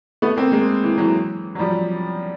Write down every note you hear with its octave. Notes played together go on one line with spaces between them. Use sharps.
A3 B3
A#3 C4
G#3 A#3
E3
E3 F#3
F#3
F3 G3